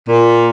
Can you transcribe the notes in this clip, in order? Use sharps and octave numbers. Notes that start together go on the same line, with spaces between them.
A#2